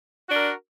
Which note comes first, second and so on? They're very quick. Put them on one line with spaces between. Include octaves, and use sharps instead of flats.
F#4 D4 A#4